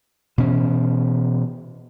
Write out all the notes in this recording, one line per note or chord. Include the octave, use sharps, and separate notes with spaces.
B2 E3 C#4